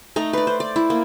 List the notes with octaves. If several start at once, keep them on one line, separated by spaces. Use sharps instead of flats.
A3 D#4 A#5
B4 D5
C5
D5
E4
A#3